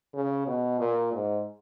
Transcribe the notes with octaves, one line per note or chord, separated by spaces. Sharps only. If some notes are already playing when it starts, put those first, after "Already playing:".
C#3
B2
A#2
G#2